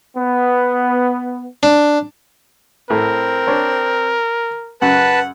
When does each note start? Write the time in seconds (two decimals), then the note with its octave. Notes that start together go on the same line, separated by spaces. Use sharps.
0.16 B3
1.63 D4
2.90 A2 C4 A#4
3.47 D4 C5 C#5
4.82 F#2 C#3 B4 F#5 A5